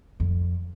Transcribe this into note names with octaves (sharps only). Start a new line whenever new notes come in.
F2